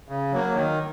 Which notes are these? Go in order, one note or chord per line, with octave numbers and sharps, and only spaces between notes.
C#3
F#3 A#3
D#3